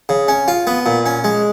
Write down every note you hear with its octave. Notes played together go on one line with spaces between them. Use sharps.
C#3
C#4
F4
B3
A#2
C#4
G#3